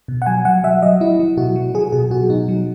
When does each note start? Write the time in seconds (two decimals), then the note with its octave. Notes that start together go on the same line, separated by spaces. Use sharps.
0.08 B2
0.22 F#5
0.26 F#3 G#5
0.45 F#3 F#5
0.64 F#3 E5
0.82 F#3 D#5
1.01 F#3 E4
1.19 F#3
1.37 B2 F#4
1.56 F#3
1.74 F#3 G#4
1.92 B2 G#4
2.11 B2 F#4
2.29 B2 D#4
2.48 F#3